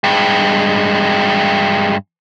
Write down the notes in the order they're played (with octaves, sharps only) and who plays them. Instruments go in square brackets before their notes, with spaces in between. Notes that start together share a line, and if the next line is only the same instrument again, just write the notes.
[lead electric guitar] G2 G#3